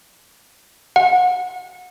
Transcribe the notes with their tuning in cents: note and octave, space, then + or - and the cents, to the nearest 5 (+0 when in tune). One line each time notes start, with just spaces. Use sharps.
F#5 -30